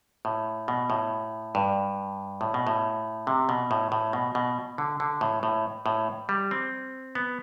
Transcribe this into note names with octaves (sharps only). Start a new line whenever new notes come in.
A2
B2
A2
G2
A2
B2
A2
C3
B2
A2
A2
B2
B2
D3
D3
A2
A2
A2
G3
C4
B3